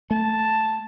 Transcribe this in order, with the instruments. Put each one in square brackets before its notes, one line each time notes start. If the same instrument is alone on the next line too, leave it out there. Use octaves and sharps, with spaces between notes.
[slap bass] A3 [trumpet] A5